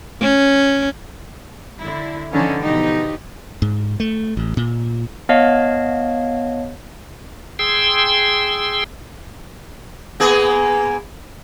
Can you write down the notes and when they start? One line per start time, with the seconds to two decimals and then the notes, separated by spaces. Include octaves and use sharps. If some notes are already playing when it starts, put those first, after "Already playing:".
0.21 C#4
1.80 D3 E4
2.33 D3 E3 F3 C#4 D#4
2.61 B2 F3 D#4 G4
3.62 G#2
4.00 A3
4.37 A1
4.57 A#2
5.29 B3 C#5 D#5 F5 A5
7.59 G#4 G5 C6 E6
10.20 A#3 B3 G#4